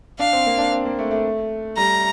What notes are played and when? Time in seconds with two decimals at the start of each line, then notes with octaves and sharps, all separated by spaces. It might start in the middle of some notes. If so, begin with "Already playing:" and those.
0.19 D4 F5
0.33 C4
0.46 A#3
0.58 D4
0.72 C4
0.85 A#3
0.99 A3
1.11 A3
1.77 G3 A#5